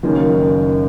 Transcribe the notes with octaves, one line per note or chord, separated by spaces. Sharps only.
F#1 F#2 D#3 A#3 C#4